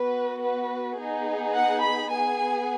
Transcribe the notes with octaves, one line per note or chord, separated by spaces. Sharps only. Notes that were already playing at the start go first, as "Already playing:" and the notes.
Already playing: B3 F#4 B4
B4
B3 D#4 G#4
F#5
B5
B3 G#4 G#5